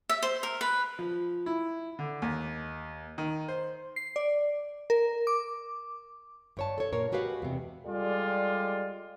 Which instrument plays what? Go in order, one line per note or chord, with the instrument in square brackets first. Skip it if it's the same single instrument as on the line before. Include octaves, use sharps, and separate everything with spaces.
[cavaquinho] E5
C5
A#4
B4
[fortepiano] F3
E4
D3
D#2
D#3
C5
[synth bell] C7
D5
A#4
D6
[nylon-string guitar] G2 C#5 A5
A4 C#5
A#2 A#4 C#5
G#3 F#4 G4 B4 F5
E2 C3
[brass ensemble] G3 G#3 F4 G4 A4 D5